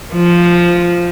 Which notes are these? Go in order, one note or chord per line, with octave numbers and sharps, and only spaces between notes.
F3